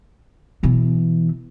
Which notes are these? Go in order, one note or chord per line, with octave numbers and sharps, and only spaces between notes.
B2 E3